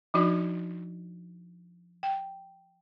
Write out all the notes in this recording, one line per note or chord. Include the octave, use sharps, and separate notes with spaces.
F3 D4 D#4 F#4 D5
G5